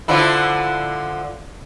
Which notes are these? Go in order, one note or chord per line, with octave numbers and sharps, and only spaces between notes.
D3 F3 E4